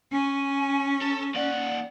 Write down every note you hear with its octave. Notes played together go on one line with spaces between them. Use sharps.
C#4 G#5
A4
D#2 D5 F#5